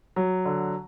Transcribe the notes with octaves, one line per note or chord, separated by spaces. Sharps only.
F#3
D3